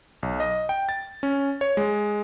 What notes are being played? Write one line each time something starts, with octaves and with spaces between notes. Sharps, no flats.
B1
D#5
G5
A6
C#4
C#5
G#3